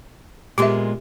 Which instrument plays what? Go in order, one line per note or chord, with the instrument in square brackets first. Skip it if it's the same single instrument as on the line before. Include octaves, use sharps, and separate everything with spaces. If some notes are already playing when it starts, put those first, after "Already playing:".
[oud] A#2 G#3 B3 [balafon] G4 E5